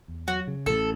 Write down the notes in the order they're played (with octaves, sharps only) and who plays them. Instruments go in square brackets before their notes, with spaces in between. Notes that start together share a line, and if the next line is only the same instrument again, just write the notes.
[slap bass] E2
[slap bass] F#3 [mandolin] F#4
[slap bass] C#3
[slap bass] A1 [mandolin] A4